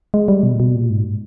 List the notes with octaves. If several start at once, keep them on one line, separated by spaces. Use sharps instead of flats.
G#3
G3
B2
A#2
B2
A#2
G#2